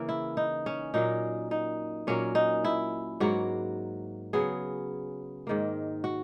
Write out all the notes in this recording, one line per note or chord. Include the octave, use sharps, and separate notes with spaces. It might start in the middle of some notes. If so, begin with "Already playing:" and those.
Already playing: C#3 E3 A#3
E4
D#4
C#4
A#2 F#3 A#3 D#4
D#4
A#2 F#3 A#3 C#4
D#4
E4
G#2 F#3 A#3 F#4
C#3 F#3 B3 G#4
G#2 D#3 A#3
F#4